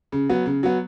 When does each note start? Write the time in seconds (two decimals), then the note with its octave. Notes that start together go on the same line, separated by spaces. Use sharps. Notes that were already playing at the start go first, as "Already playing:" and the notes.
0.12 C#3
0.29 F#3 B3
0.46 C#3
0.63 F#3 B3